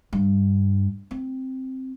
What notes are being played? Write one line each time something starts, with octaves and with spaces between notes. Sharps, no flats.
G2
C4